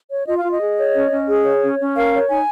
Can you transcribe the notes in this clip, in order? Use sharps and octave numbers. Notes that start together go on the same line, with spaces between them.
C#5
F4 D#5
F5
F4
D#5
G#4
C#5
C#4
C#4
G#4
C#5
C#4
C#4
A#4 F5
C#5
D#4 G#5